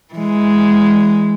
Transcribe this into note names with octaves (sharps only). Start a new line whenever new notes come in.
E3 G#3